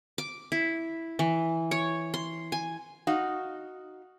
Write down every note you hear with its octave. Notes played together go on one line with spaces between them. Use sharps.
D6
E4
E3
C#5
C6
G#5
D#4 F#4 F5